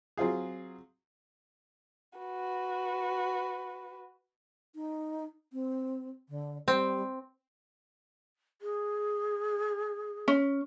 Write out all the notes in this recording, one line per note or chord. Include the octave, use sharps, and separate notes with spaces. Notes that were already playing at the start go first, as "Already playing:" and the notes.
F#3 C4 F4 G#4
F#4 B4
D#4
C4
D3
G3 C4
G#4
C#4